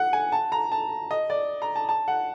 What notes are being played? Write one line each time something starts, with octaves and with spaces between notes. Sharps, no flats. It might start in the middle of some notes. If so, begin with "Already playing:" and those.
Already playing: F#5
G#5
A5
A#5
A5
D#5
D5
A#5
A5
A5
F#5